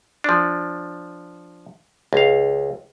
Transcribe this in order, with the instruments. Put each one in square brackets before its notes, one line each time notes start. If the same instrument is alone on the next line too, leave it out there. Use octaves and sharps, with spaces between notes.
[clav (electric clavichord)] F3 D4
C#2 F5